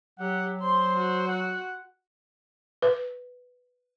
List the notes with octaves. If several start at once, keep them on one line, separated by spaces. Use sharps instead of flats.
F#3 G4 F#5
C5 C6
F#4
F#5
B4